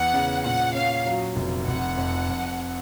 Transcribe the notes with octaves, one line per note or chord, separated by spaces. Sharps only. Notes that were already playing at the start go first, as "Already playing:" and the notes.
Already playing: E2 F#5
C#3
A#2 F#5
C#4 F5
F#3
F1
F1 F#5
F2
F2